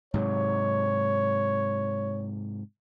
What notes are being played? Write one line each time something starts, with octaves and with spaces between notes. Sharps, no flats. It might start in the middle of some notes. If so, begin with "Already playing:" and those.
G#2 C3 F#3 C#5